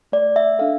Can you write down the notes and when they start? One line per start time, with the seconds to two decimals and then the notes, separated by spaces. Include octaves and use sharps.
0.12 A3 D5
0.36 E5
0.59 D4 A4 F5